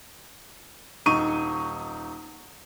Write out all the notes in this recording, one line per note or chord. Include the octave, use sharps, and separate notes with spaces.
D#1 D#4 C#6 D#7